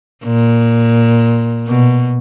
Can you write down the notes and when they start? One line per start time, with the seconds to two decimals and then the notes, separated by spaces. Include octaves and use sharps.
0.24 A#2
1.67 B2